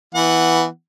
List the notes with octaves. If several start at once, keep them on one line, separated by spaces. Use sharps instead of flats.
E3 B3 F#5